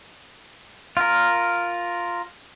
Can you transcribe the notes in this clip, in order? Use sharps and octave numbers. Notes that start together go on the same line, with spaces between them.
F4 A#4